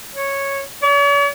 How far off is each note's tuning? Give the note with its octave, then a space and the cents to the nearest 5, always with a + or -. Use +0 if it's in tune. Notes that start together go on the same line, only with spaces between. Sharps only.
C#5 -5
C#5 +45